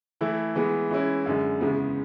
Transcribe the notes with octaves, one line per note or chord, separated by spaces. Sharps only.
E3 A3 E4
E3 G#3 B3
E3 G#3 C#4 E4
F#2 D3 G#3
E2 C#3 G#3 B3